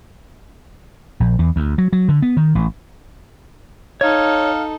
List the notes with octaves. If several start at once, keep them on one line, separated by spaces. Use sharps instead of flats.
A#1
E2
D2
F#3
F#3
D3
B3
D#3
A1
D#4 A4 C#5 F5